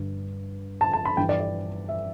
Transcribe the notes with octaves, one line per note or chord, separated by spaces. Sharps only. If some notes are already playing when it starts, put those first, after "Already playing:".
Already playing: G2 D3
A5
A5
B5
G2 E3 G5
D5
D5
E5